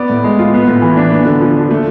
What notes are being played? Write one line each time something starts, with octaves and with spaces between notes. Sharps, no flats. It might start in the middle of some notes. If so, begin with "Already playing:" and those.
Already playing: B3 D5
A2
G#3
F4
B3
A2
E3
D4
B3
D3
F3
D4
A3